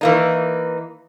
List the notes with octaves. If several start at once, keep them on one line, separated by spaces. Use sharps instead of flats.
E3 A#3 D#4